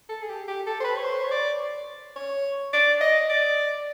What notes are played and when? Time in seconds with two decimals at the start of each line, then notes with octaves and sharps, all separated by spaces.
0.09 A4
0.22 G#4
0.29 G4
0.48 G4
0.67 A4
0.80 C5
0.84 B4
0.97 C#5
1.04 C5
1.23 C#5
1.31 D5
2.16 C#5
2.73 D5
3.01 D#5
3.30 D5